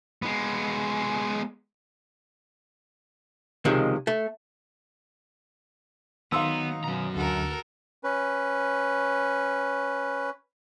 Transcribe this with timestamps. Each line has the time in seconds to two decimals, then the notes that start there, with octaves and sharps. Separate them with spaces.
0.22 G#3 B3
3.65 C#2 C3 D#3 F3 G#3
4.07 A3
6.32 D#3 F#3 B3 D#4 F5 C6 D#6 E6
6.84 F#2 B2 A#5
7.15 D2 D3 F#4 A4 A#4
8.04 C#4 B4